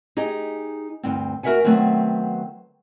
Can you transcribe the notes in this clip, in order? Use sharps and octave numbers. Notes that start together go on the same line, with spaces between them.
D#4 G4 G#4 D#5
D2 G2 C4
F#4 A#4 C#5 E5 F#5 G#5
D#3 F#3 A3 B3 C4